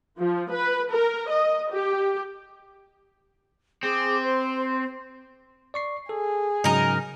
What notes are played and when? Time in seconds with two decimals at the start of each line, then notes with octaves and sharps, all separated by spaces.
0.18 F3
0.52 B4
0.91 A#4
1.29 D#5
1.71 G4
3.83 C4 G#4 D6
4.22 C5
5.74 D5 C#6 C7
6.09 G#4 A4
6.64 G#2 C#3 F#3 D#4 A#4